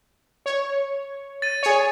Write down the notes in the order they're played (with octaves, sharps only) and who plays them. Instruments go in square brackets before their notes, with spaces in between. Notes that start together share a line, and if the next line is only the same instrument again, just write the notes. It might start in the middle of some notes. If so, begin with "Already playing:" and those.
[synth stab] C#5
[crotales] A6 D#7
[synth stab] G#4 C#5